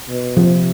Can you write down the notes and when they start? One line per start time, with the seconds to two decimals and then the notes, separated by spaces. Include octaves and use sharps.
0.09 B2
0.37 C3 F3